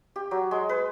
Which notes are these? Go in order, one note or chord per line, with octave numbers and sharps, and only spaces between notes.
G4
F#3
G#3
B4